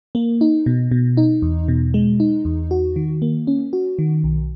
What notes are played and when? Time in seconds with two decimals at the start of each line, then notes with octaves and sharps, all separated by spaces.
0.15 A#3
0.41 D#4
0.66 B2
0.91 B2
1.17 D#4
1.42 E2
1.68 B2
1.94 G#3
2.20 D#4
2.45 E2
2.71 F#4
2.96 D#3
3.22 A#3
3.47 C#4
3.73 F#4
3.99 D#3
4.24 B1